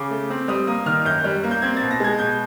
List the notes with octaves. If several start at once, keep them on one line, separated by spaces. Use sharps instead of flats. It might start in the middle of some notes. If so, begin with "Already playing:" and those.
Already playing: C#3 D6
A3
C4
G3 D#6
A#3 D#6
D#3 F6
F#2 G6
G3
A#3
G6
C4 G#6
B2 A6
A#6
G#3 G#6
B2 G6